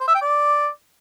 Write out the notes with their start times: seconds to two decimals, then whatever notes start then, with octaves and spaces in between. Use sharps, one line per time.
0.01 C5
0.08 E5
0.14 G5
0.21 D5